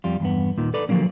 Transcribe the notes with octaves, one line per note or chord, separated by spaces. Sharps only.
F2 G3 F4
E2 G2 B3
D#2 A#2 D#3
A4 B4 D5
D3 F3 F#3 A#3 C#4